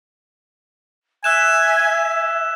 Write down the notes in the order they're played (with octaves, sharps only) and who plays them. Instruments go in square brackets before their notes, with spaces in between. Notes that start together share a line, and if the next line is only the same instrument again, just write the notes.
[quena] E5 [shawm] G#5 [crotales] E6 F#6 E7